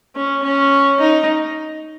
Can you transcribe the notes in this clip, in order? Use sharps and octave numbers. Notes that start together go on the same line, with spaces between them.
C#4
C#4
D#4